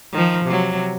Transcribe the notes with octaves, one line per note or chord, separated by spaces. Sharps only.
D#3 F3
C3 F#3